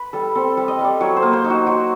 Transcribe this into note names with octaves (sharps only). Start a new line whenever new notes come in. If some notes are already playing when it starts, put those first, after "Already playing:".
Already playing: B4
G3 A4
C4 A4
G3
D#5
G3
D5
F#3 C#5
C5
A#3
C5
D#4
F#4
F#3